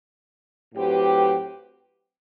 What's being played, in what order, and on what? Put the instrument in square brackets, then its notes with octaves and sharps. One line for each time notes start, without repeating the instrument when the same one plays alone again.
[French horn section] A2 F#3 C4 G4 B4